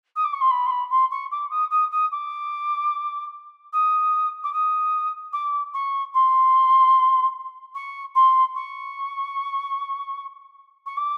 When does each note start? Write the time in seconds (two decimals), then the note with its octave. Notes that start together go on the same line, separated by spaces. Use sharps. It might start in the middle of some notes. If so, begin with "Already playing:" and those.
0.15 D#6
0.24 D6
0.33 C#6
0.41 C6
0.50 B5
0.66 C6
0.70 B5
0.90 C6
1.11 C#6
1.31 D6
1.50 D#6
1.70 D#6
1.91 D#6
2.11 D6
3.72 D#6
4.43 D6
4.53 D#6
5.32 D6
5.74 C#6
6.14 C6
7.74 C#6
8.15 C6
8.55 C#6
10.86 C#6
10.97 D6